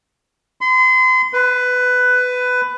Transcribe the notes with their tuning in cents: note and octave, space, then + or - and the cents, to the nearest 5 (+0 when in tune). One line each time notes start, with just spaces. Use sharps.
C6 -35
B4 +15